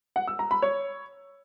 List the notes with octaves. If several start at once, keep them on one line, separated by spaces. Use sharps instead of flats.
F#5
E6
A#5
B5
C#5